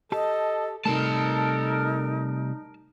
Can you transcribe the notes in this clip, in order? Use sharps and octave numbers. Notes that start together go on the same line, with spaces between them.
G4 A4 D#5 A5
C3 G3 A3 D#4 A4 A#4 A5